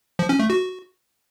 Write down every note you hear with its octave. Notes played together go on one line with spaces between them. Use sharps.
F3
C#4
A3
F#4